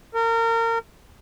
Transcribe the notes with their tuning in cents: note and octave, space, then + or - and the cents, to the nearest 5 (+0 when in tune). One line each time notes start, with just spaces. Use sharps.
A#4 -30